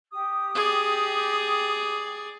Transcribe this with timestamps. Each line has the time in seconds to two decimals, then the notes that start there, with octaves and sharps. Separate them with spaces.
0.12 G4 D#6
0.55 G#4 D5